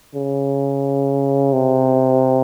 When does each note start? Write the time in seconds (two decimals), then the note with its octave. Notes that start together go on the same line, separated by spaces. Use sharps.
0.15 C#3
1.53 C3